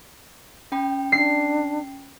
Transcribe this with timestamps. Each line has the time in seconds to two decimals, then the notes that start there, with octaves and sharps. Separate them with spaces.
0.72 C#4 G5 B5
1.12 D4 C7